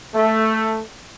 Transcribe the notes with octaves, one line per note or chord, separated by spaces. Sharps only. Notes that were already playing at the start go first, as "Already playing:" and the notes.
A3